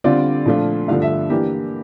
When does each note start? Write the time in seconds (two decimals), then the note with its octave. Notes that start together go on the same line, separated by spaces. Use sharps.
0.04 D3 G3 C4 F4 D5
0.46 A#2 F3 A3 D4 F4
0.88 G2 D3 F3 A3 F5
1.02 E5
1.30 E3 A#3 D4 G4